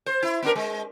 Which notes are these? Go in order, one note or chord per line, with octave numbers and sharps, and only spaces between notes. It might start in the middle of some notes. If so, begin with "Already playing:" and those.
C5
E4
B3 D4 A#4
G#3